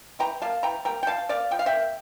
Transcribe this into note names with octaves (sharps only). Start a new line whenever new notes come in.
E3 G5 A#5
G3 A#3 F5 A5
E3 G5 A#5
G3 A#3 G5 A#5
G5
F3 F5 A5
A#3 D5 F5
F3 G5
F5
E5 G5
A#3